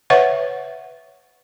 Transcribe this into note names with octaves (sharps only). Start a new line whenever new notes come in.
B4 C#5 E5 F#5 C#6